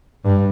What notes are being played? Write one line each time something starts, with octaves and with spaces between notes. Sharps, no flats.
G2